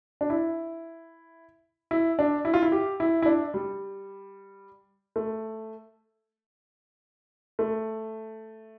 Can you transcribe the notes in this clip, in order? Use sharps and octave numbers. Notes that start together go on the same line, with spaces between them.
D4
E4
E4
D4
E4
F4
E4
G4
E4
E4
D4
G3
A3
A3